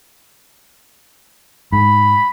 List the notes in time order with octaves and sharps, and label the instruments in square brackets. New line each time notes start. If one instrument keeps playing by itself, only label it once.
[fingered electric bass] G#2 [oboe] B5